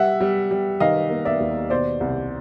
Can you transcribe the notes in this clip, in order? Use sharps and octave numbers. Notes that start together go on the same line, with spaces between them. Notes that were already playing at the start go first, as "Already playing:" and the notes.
Already playing: G3 E5 F#5
G3
G3
D#3 D#5 F5
A#3
D5 E5
D#2
B2 C5 D5
C2